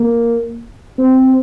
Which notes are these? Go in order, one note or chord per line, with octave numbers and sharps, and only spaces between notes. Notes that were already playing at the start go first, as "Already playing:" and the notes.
Already playing: A#3
C4